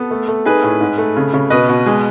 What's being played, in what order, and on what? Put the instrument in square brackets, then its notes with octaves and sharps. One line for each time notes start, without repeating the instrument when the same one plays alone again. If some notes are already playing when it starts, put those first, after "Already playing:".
Already playing: [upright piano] B3 A4
A3
A3
D#4 G#4 B4
A2
G#2
A3
C#3
C#3
B2 B4 D#5
B2
G#3